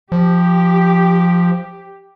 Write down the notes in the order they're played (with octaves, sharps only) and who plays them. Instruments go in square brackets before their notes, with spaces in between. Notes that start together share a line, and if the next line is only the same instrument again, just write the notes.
[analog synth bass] F3 [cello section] G4